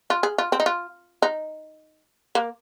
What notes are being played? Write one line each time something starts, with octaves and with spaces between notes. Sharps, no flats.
F4
G#4
F4
C4
D#4
F4
D#4
A#3